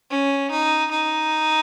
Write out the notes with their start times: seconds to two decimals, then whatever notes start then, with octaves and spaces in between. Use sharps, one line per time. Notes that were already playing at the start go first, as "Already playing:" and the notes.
0.10 C#4
0.51 D#4
0.91 D#4